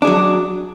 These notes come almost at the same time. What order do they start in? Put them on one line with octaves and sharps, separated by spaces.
D4 G#4 F#3